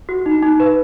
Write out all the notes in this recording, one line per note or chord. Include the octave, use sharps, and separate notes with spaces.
F#4
D#4
D#4
B4